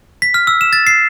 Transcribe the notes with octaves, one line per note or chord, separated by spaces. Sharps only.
B6
F6
E6
E7
A6
C7